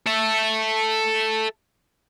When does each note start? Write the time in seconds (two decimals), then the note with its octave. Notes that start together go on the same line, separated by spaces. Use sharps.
0.06 A4 E5